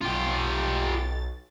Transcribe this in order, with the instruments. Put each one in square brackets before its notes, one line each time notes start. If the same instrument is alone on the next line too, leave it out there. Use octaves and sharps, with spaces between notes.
[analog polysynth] B1 A6 [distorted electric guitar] F4 G4